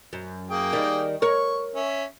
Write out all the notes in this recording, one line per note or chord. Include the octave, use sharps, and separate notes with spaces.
F#2
A#3 G#4 G5
D#3 G3
A#4 C#5 C#6
C#4 E5